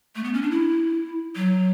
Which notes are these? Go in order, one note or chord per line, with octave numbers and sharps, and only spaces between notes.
A3
B3
C#4
D4
E4
F#3